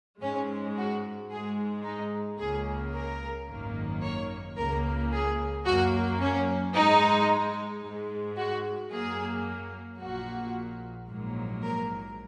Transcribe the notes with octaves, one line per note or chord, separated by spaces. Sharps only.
G#2 G#3 C#4
F#4
G#2 G#3 G#4
D#4
C#2 C#3 A#3 G#4
A#4
G#1 F#2 D#3 A#3
C#5
C#2 C#3 A#3 A#4
G#4
F#2 F#3 A#3 F#4
C#4
G#2 G#3 D#4
G#2 G#3
F#4
F#2 F#3 A#3 G#4
A#1 A#2 A#3 F#4
A#1 G#2 F#3 A#3
A#4